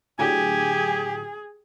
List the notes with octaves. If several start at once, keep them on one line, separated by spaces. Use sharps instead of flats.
A2 D3 F#3 G4 G#4 G#5